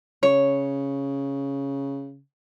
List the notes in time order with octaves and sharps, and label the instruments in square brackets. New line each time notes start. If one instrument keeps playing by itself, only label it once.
[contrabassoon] C#3 [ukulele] C#5